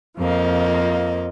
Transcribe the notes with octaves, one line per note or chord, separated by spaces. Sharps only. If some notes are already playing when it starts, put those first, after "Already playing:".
F2 F3 A#3 D#5